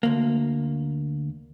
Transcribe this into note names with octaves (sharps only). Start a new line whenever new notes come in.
D2 A#3